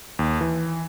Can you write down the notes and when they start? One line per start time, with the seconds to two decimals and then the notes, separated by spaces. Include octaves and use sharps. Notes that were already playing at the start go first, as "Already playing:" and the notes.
0.19 D#2
0.41 E3